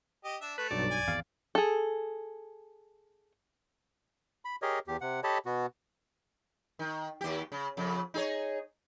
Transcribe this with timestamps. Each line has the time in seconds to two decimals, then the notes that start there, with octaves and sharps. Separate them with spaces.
0.25 G4 D#5
0.42 D4 E5
0.58 A3 B4
0.71 B1 G2 F#3 D5
0.91 G#5
1.08 G#1 E2 F5
1.55 G#4 A4
4.45 B5
4.62 G4 G#4 A#4 C#5 D#5
4.88 E2 G4
5.01 C3 F#5
5.24 G4 A4 C#5 D#5 A5 B5
5.46 B2 B3 F#4
6.79 D#3
7.21 D#2 G4
7.52 C#3
7.77 F2 C#3
8.14 D#4 G#4 C#5